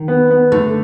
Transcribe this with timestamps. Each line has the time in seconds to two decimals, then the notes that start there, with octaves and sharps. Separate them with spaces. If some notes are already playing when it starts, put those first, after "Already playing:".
Already playing: D#3
0.08 B3
0.31 B3
0.52 D3 A3